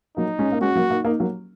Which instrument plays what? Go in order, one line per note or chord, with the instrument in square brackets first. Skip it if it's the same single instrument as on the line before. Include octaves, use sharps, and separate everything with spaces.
[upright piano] F#3 A#3 [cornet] D#4
[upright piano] G#3 C#4
A#3
[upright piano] G#3 C#4 [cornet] F#4
[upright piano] F#3 A#3
A#3 D#4
A#3 D#4
F#3 A#3